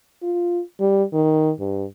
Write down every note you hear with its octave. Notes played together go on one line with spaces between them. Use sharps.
F4
G3
D#3
G2